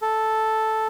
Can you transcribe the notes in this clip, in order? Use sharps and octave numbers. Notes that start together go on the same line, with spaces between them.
A4